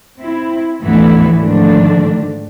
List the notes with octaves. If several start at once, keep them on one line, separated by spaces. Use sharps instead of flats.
C4 E4
D2 A2 E3 F3 B3 E4
G#2 D3 D#3 F3 A3 D4